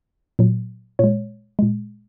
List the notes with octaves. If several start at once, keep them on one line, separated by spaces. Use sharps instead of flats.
A#2 F#3
A#2 G#3 C#5
A#2 G#3